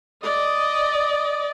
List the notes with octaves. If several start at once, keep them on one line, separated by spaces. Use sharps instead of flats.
D5 D#5